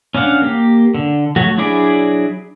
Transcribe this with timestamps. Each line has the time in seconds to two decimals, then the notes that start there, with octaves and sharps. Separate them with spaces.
0.15 C#4 D4 F5 F#5
0.42 A#3 G4
0.95 D3
1.36 F#3 A3 F#4
1.58 F#3 D4 E4 G#4 D5